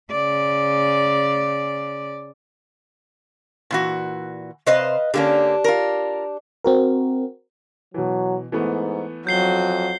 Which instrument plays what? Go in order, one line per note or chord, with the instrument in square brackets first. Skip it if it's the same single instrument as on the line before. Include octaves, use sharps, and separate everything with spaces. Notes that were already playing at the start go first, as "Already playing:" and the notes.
[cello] C#3 D5
[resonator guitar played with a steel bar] A#2 E3 F#4
[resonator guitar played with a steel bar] C3 C5 [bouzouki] B4 D#5 F5
[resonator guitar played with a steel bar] D3 A#3 C#4 [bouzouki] D4 G4
[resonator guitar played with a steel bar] F4 A#4
[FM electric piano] C4 F#4 A#4
[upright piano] B2 E3 [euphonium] F#3
[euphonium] G#2 [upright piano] E3 A3 B3
[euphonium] F2 [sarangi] F#3 [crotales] G6 C7 G7